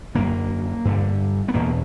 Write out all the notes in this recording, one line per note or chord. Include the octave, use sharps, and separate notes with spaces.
F#2 D3 A#3
G2 D3
B3
E2 B2 A#3